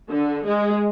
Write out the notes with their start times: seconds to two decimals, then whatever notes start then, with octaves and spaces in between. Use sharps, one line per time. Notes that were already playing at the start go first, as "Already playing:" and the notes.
0.11 D3
0.45 G#3